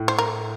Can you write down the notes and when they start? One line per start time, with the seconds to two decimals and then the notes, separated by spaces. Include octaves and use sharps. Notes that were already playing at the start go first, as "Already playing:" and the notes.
Already playing: A2
0.08 C5
0.18 A#4